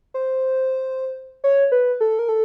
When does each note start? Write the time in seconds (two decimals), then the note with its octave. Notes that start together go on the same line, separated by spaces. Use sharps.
0.14 C5
1.44 C#5
1.72 B4
2.01 A4
2.19 A#4
2.29 A4